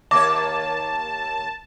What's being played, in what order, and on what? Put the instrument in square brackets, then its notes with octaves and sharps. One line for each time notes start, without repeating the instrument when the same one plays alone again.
[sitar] D#2 A#3 C#5 [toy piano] E5 D6 [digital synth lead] A5